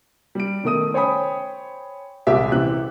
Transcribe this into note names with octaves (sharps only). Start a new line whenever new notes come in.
G3 D7
B2 D#3 A3 D#6 D#7
C5 C#5 G5 G#5 B5 D#6
D#1 C2 G#3 G4 E5 D6
C3 E3 G4 F#6